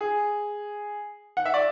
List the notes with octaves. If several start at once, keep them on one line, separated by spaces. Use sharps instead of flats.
G#4
F#5
E5
D5